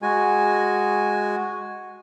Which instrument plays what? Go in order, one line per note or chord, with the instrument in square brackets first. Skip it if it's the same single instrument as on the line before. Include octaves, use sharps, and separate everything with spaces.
[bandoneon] G#3 F#4 G#5